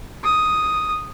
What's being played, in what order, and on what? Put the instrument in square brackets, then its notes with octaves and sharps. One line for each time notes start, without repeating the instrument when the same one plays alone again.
[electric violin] D#6